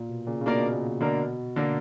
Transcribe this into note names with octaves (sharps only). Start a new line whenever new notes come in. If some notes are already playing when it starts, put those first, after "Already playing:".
Already playing: A#2
B2
A#2 C#3
C#3
B2 A#3 D4 A#4 D5
B2
A#2
B2
B2 D3 A#3 D4 A#4
D3 A#3 D4 A#4